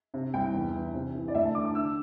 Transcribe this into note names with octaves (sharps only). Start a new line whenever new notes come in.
C3
C2 G5
E2
E3
C3
E3
D5
D2 E5
A5
D3 D6
D6
D3 E6